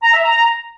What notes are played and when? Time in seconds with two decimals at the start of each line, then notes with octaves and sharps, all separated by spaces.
0.03 A#5
0.13 E5
0.23 A#5